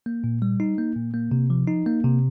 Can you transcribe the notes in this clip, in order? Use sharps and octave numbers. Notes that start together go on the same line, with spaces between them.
A#3
A#2
G3
D#4
A#3
A#2
A#3
C3
F3
D#4
A#3
C3